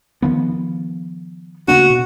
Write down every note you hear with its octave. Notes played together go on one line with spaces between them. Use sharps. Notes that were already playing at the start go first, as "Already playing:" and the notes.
D#3 F3 B3
C#3 A#3 D4 F#4
B2